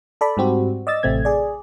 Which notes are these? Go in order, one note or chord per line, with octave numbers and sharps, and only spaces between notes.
A4 D5 B5
G#2 G3 C4 F#4
D5 D#5 E6 A6
A1 C3 A3 C4 G#6
G#4 D5